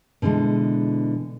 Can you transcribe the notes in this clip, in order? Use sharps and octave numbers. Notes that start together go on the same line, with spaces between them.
B2 D3 E3 G#3